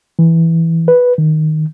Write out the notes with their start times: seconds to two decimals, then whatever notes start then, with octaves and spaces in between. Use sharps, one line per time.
0.19 E3
0.88 B4
1.18 D#3